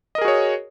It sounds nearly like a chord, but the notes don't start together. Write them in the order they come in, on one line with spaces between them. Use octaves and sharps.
D#5 A#4 G#4 F#4 C#5